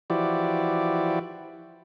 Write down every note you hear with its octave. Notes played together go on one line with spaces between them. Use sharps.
E3 F3 E4 F#4 G4 D5